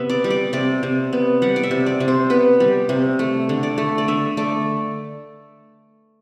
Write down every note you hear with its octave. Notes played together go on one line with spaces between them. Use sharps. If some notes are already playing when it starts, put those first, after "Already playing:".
Already playing: C3 B3 E5
D5
G3
D5
C3 D5
C3
B3
G3 F#5
D5
E5
C3
D5
C3
C5
B3 B4
G3
C3
A3
D3
D5
A3
D5
D3 E5
A3 D5